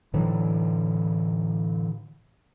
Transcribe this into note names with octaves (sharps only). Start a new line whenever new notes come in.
A2 D3 E3 F#3